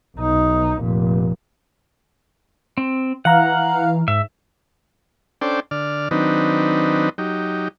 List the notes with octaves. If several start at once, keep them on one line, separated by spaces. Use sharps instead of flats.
B1 D#4
F1 A#2
C4
E3 F5 F#5 A#5 F6
G#2 E5
C#4 D4 A4 C5 D5 G5
D3 D5 F6
D#3 F#3 C4 D4 D#4 B4
F#3 D#4 G4